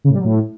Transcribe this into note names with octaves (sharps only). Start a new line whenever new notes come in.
C#3
A2
G3
F#3
A2